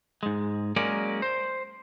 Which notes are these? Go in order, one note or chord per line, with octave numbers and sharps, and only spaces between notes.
G#2 G#3
F#3 G#3 A#3 C#4 A#4 D5
C5